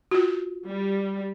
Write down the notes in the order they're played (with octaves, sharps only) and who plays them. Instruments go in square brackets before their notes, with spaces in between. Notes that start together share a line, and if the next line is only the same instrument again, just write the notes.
[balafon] F4 F#4
[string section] G3